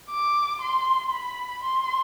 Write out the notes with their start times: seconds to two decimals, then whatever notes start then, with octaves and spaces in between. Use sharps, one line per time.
0.10 D6
0.62 C6
1.13 B5
1.63 C6